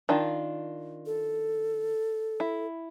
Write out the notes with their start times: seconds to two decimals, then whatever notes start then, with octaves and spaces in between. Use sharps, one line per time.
0.09 D#3 D4 F4
1.06 A4
2.40 E4